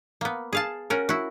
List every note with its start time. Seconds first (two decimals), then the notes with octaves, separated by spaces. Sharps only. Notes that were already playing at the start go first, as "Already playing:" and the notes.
0.21 A#3 B3
0.53 G#4 F5 A5
0.90 C#4 F#4 A#4
1.09 E4 F#4